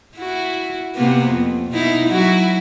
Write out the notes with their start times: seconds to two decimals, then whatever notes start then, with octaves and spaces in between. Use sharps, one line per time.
0.17 E4 F#4
0.95 C3 A#3 B3
1.30 F2
1.71 B2 D#4 E4
2.06 F#3 E4 F#4